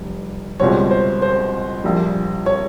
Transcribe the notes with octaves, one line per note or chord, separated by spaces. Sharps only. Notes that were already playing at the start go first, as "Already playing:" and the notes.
Already playing: F1 G3
C#2 B2 G3 C4 C#5
C5
C5
A#1 A#2 G3
C#5